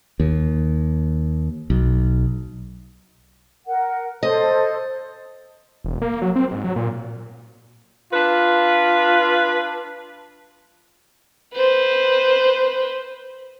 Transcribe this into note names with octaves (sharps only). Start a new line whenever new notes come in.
D#2
B1
A#4 F#5
A4 C5 D#5
E1
A#3
F#3
C4
G#2
F#3
A#2
D4 F4 B4
B4 C5